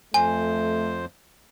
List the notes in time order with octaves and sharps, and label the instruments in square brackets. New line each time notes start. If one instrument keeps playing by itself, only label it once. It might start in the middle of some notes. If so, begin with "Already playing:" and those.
[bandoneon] F2 C5 [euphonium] A3 [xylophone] G#5